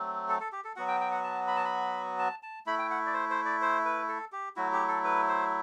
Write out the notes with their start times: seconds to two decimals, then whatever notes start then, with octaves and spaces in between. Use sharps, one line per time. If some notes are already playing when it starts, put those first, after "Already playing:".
Already playing: F#3 A3 C4
0.29 A4
0.40 A4
0.52 G4
0.64 A4
0.76 F#3 B3 F#4 F#5
0.88 G5
1.00 G5
1.11 F#5
1.24 A5
1.48 B5
1.56 A5
1.65 B5
2.19 A5
2.43 A5
2.66 A3 E4 B5
2.79 G5
2.90 F#5
3.06 D5
3.14 C5
3.30 C5
3.45 D5
3.62 C5
3.85 B4
4.08 A4
4.32 G4
4.56 F#3 A3 E4 F#4
4.72 G4
4.88 A4
5.04 B4
5.28 C5